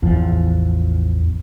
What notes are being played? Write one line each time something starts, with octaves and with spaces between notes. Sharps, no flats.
A1 E2 F3